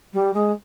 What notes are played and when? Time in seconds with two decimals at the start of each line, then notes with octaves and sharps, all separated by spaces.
0.13 G3
0.33 G#3